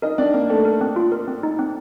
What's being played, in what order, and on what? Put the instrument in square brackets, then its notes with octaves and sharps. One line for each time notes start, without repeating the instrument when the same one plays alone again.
[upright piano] D#4 D#5 [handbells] A#4
[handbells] C4 [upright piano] D4 D5
[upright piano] A#3 A#4 [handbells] C4
[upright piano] A3 A4 [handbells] C4
[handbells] A#4
C4
F4
A#4
C4
D#4
C4